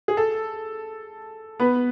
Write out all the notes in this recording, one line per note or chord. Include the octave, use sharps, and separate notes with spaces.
G#4
A4
B3 B4